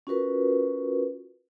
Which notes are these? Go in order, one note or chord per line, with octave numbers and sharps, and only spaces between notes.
C#4 F4 F#4 A#4 B4